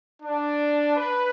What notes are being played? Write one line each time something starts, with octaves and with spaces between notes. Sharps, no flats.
D4
B4